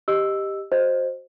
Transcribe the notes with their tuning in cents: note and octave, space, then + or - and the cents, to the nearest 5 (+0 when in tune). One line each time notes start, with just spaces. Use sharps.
G4 +0 D#5 +0 E6 +0
F#4 +0 C5 +5 D#5 +0